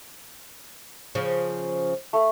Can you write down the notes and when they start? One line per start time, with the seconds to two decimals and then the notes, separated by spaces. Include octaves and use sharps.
1.15 C#3 F3
2.13 A3